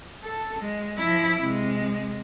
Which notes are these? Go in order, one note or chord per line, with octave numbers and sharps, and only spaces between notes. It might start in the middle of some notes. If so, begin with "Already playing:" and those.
A4
G#3
F3 E4
C3 G#3